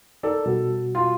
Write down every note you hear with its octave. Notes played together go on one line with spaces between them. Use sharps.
D#4 A4 A#4 D5
B2 G3 F#4
F4